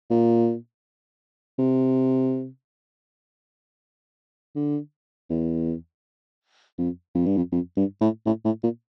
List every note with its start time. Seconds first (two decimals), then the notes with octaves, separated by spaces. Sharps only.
0.10 A#2
1.58 C3
4.55 D3
5.30 E2
6.78 F2
7.15 F2
7.26 G2
7.36 F2
7.52 F2
7.76 G2
8.01 A2
8.26 A2
8.45 A2
8.63 A#2